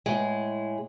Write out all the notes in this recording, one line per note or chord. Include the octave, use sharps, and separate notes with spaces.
A2 G#3